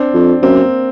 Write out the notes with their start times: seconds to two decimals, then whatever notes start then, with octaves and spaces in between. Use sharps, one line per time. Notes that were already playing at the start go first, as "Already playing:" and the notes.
Already playing: C4 D4
0.14 F2
0.42 F#2 A#3 C4